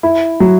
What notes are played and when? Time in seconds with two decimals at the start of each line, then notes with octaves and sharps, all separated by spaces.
0.03 E4
0.40 F#3